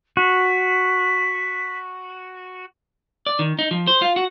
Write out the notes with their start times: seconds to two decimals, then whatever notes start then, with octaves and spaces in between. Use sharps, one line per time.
0.17 F#4 B6
3.26 D5
3.39 D#3
3.59 D#4
3.71 F3
3.87 C5
4.02 F4
4.16 F#4